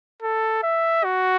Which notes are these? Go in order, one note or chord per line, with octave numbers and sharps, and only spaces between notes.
A4
E5
F#4